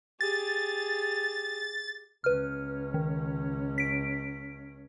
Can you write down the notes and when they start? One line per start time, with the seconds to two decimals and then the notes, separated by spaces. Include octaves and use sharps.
0.21 G4 G#4 A6
2.24 C#2 C#4 B4 F6
2.94 D#3
3.78 B6 D7